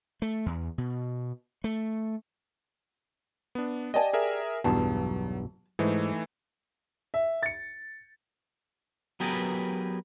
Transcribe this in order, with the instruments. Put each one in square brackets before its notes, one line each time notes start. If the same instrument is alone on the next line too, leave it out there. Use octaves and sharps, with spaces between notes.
[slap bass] A3
E2
B2
A3
[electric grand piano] B3 D4
[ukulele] G4 D5 G#5 [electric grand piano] D#5 A5
[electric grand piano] G#4 A#4 E5
[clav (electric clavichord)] B1 E2 G2 [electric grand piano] F#3 [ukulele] A5
[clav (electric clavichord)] G#2 [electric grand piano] E3 A3 [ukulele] D#4
[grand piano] E5
A6 C#7
[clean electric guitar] F#3 B3 G4 G#4 A#4 B4